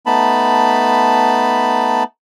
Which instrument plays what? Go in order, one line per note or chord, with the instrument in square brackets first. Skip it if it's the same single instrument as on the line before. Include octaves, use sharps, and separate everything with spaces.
[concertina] A3 B3 D#4 A5 B5